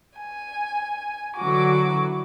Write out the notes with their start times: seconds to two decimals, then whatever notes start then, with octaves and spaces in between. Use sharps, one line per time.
0.18 G#5
1.36 D3 E3 F#3 F#4 D6